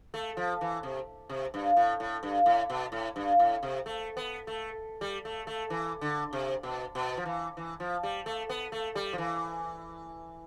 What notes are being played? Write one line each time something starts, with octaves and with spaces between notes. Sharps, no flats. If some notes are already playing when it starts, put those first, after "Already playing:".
A3
F3
E3
C3
C3
G2
A2
A2
G2
A2
B2
A2
G2
A2
C3
A3
B3
A3
G3
A3
A3
E3
D3
C3
B2
B2
F3
E3
E3
F3
G3
A3
B3
A3
G3
F3
E3